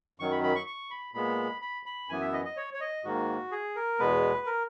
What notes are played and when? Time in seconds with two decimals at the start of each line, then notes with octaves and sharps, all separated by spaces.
0.20 F#2 D#3 F#3 C#6
0.31 B5
0.43 B5
0.55 C#6
0.67 C#6
0.91 B5
1.14 A#2 G#3 B3 B5
1.62 B5
1.86 B5
2.09 F#2 E3 B3 G#5
2.21 E5
2.33 D#5
2.45 D#5
2.57 C#5
2.74 C#5
2.80 D#5
3.04 G#2 D#3 A#3 F#4
3.52 G#4
3.76 A#4
3.99 E2 B2 G#3 B3 B4
4.46 A#4